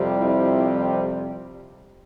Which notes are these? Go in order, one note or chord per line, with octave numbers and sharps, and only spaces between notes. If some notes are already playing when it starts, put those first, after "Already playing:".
Already playing: F2 C3 G3
E4